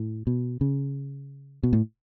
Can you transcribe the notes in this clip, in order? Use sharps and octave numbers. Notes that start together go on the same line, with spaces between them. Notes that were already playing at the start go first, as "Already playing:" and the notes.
Already playing: A2
B2
C#3
B2
A2